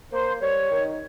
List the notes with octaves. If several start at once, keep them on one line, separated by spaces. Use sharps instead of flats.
A#3 C5
G3 C#5
D#3